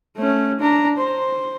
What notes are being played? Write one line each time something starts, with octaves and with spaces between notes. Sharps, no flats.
A3 C#4
D4 A#5
C5